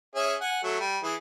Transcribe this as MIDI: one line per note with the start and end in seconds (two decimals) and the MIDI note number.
0.15 0.34 61
0.15 0.34 68
0.15 0.34 76
0.41 0.59 78
0.41 0.59 80
0.64 0.79 54
0.64 0.79 57
0.80 0.98 55
1.04 1.15 52
1.04 1.15 68